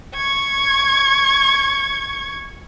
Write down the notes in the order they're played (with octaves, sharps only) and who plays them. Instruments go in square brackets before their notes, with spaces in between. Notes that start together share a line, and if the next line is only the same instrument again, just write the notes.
[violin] C#6 G#6